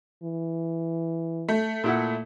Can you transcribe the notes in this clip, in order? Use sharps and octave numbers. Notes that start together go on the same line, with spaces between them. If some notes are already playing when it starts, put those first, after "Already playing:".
E3
A3
A#2 E4 F#5